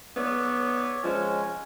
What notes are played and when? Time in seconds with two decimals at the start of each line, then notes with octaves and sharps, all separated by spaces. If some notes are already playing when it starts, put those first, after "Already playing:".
0.16 B3 C#5 D5 E5
1.04 F3 G#3 C#4 G#5